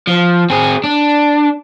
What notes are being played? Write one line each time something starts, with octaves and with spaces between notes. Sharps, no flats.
F3
C4 G#4
D4